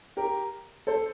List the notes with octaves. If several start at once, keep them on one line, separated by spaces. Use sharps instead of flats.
G4 A#4
A4 C5